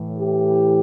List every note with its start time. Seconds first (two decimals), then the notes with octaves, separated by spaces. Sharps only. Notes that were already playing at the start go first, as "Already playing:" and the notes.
Already playing: A2 E3
0.16 G4